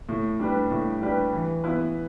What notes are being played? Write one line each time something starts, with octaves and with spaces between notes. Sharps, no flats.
A2
G3 D4 G4 B4
A2
G3 D4 G4 B4
E3
B3 E4 B4